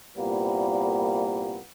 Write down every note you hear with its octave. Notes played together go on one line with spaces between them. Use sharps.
C2 A#2 G3 A#3 B3